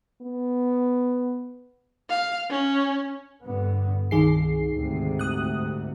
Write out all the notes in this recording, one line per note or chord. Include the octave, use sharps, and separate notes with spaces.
B3
F5
C#4
G2 D3 B3
C2 D#3 G#4 C7
D2 G#2 C3
D#6 F#6